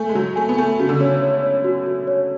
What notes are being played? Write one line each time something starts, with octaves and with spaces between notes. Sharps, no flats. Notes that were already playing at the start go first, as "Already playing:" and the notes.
Already playing: A3 G#5
G#3
F#3 F#4
A3 G#5
B3
A3 G#5
C#3 F#4
D3
C#3 C#5
C#5
C#5
F#4
F#4
C#5